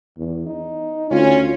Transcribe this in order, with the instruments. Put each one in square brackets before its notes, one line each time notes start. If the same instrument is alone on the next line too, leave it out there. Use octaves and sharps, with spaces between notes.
[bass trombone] E2
D#4
[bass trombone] D2 [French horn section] C#4 F4